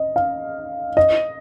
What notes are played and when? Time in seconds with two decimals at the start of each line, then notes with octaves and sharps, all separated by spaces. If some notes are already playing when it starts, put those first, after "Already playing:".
Already playing: D#5
0.16 F5
0.97 D#5